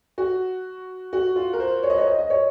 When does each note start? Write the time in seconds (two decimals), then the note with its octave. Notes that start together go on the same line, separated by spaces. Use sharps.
0.18 F#4
1.13 F#4
1.36 F4
1.53 A#4
1.60 C5
1.83 C#5
1.90 D#5
1.98 C#5
2.07 D#5
2.19 D#5
2.30 C#5